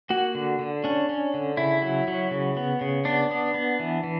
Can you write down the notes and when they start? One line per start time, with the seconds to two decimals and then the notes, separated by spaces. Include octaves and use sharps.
0.10 A#3 F#4
0.35 D3
0.59 D3
0.84 C#4 D4
1.09 C#4
1.34 D3
1.57 C#3 E4
1.82 F#3
2.08 F#3
2.31 C#3
2.57 B3
2.81 C#3
3.05 B3 D4
3.30 B3
3.54 B3
3.79 E3
4.04 E3